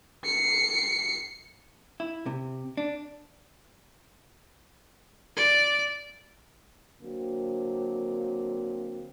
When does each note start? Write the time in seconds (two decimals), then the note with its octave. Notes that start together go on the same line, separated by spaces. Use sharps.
0.25 C7 C#7
2.00 E4
2.26 C3
2.77 D4
5.37 D5
7.02 D3 F#3 A#3 C4